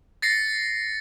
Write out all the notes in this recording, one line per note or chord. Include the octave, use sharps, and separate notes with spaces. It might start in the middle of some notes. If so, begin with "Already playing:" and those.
A6 A#6 C7 C#7